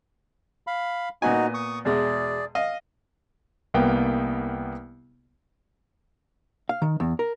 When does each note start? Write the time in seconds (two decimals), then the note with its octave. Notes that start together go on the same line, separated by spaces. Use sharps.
0.67 F5 B5
1.22 A#2 B3 D#4 F#4 G#5
1.54 C#6 D#6
1.85 E2 B2 G#3 G#4 D5
2.55 D#5 F5
3.74 C2 A#3 B3 G5
6.69 F5
6.82 D#3
7.00 E2
7.19 A#4